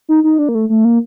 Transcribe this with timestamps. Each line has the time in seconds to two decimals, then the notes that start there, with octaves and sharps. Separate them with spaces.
0.09 D#4
0.24 D#4
0.39 D4
0.49 A#3
0.55 A3
0.69 A3
0.85 A#3